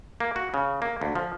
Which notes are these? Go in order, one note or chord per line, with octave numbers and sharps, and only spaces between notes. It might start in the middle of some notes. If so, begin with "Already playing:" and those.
A#3
F#4
C#3
A#3
D2
F3